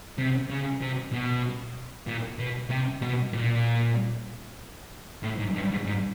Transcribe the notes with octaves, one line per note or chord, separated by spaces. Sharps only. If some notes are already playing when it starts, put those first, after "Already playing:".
C3
C#3
C3
B2
A#2
B2
C3
B2
A#2
A2
G#2
G2
G#2
G#2